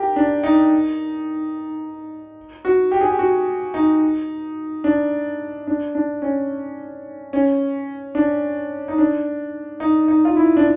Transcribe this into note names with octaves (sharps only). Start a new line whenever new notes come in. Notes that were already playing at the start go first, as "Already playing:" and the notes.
Already playing: G4 A#4
D4
D#4
F#4
G4
G#4
G4
F#4
D#4
D4
D4
D4
C#4
C#4
D4
D#4
D4
D#4
D#4
F4
E4
D4